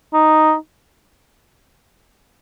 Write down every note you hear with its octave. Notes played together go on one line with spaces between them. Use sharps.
D#4